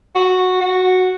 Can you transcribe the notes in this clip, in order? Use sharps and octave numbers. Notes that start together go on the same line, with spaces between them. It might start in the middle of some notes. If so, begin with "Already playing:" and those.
F#4
F#4